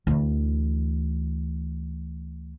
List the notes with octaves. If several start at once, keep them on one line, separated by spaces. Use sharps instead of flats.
D2 E3